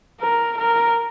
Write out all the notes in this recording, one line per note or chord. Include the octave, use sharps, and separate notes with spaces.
A#4
A#4